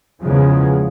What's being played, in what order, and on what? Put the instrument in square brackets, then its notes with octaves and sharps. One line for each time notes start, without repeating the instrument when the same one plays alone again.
[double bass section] E2 C#3 F3 G#3